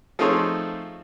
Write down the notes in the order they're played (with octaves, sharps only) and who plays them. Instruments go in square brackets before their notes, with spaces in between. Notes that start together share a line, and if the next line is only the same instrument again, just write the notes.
[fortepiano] F3 A3 C4 D#4 G#4 C#5